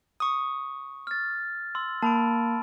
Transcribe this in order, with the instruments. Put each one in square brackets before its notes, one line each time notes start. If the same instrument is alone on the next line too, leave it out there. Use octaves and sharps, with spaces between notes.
[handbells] C#6 D#6
[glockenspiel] F6 A6
C6 E6
[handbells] A#3 [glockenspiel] A5 B5 D7